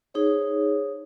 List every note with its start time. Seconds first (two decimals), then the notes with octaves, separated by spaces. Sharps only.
0.14 D#4 G#4 C5 C#5